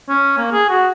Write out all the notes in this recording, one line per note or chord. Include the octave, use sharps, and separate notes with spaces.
C#4
A#3
G#4
F#4